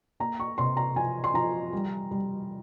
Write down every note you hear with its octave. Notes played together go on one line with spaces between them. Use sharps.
A#3 A#5
C#6
C3 C6
A#5
F3 G#5
C6
F3 A#5
G3
G3